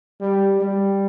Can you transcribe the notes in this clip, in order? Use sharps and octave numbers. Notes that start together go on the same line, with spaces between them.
G3
G3